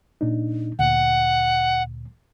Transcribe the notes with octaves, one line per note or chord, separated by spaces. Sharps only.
A#2 D4 D#4
D2 A#2 F#5